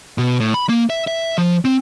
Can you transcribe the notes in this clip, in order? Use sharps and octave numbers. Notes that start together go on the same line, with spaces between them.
B2
A2
B5
A#3
E5
E5
F3
C4